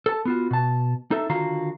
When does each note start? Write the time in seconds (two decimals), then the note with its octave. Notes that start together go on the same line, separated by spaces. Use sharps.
0.06 A4 A5
0.25 B3 F4 F#4
0.51 B2 A5
1.11 D#4 A4 E5
1.29 D3 D#3 F4 F#4 F5 A#5